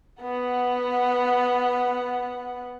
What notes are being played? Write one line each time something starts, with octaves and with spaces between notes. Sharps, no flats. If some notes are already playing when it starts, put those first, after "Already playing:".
B3 F#5